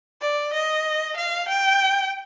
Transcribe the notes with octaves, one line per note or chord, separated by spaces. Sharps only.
D5
D#5
F5
G5